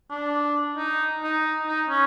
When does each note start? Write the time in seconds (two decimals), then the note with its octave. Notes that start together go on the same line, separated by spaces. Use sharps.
0.10 D4
0.77 D#4
1.23 D#4
1.67 D#4
1.89 C#4